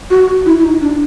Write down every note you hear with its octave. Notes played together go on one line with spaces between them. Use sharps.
F#4
E4
E4
D#4
D4